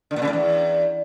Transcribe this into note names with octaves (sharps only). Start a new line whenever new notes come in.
D3
A#2
C#3
A2
E2